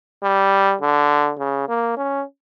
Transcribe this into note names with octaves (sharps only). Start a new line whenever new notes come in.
G3
D3
C#3
A#3
C#4